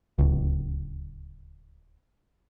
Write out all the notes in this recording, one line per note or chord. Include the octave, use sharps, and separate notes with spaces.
D1 C#2